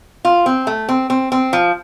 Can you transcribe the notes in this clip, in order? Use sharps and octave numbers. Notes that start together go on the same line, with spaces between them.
F4
C4
A3
C4
C4
C4
F3